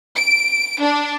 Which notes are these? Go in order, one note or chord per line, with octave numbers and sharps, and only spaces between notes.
D7
D4